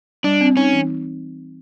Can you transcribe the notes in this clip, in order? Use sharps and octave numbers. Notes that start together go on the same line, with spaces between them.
G3 D4
C4
C#4 D#4
E3